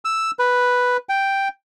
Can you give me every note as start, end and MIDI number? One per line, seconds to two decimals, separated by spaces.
0.05 0.31 88
0.39 0.97 71
1.09 1.48 79